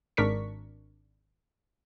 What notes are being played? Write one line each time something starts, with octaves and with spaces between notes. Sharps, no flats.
G#1 D4 A#4 C#6 B6